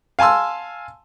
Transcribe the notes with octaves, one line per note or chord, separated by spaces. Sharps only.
F5 G#5 A5 C6 E6